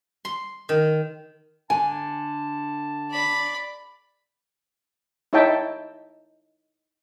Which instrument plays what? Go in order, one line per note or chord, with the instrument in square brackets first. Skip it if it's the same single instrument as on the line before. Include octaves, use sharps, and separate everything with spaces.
[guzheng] C6
D#3
[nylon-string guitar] D3 [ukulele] G#5 [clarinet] A5
[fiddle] D5 B5
[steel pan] D#4 E4 C#5 E5 G5 A5